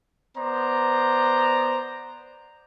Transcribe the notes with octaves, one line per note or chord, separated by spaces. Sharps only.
B3 C5 D5 A#5